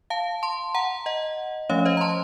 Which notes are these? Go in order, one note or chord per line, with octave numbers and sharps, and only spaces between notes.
F5 A5
A5 C6
F#5 A#5
D#5 F#5
F3 A3 C#4 C#5 F5
C5 D#5
A#5
A5 C6